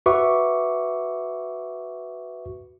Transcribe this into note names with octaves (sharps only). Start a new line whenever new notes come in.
F#4 B4 E5 C#6 D6